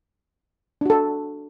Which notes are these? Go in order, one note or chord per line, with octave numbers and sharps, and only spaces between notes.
D4 F#4 A4